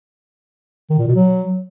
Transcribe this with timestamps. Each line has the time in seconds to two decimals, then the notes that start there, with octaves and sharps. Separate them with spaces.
0.90 D#3
0.98 A#2
1.07 B2
1.15 F#3